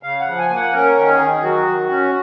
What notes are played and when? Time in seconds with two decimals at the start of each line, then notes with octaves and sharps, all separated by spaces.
0.03 C#3 F5
0.20 F#5
0.27 F3
0.38 G#5
0.50 A#3
0.56 F#5
0.73 C#4 A#4
0.96 D#3
1.08 G#4
1.20 D#3
1.42 F#3 F#4
1.66 D#3
1.90 C#4